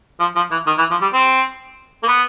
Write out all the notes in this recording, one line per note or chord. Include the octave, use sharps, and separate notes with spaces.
F3
F3
E3
D#3
E3
F3
G3
C4
A#3
B3